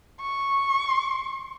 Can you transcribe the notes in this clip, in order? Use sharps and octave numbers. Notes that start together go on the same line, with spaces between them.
C#6